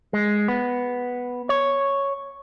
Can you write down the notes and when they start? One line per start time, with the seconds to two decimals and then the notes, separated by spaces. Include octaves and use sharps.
0.13 G#3
0.48 B3
1.49 C#5